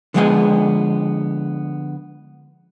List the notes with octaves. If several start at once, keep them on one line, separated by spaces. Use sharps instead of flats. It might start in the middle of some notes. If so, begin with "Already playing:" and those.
D3 F3 G#3 B3 G#4 G#5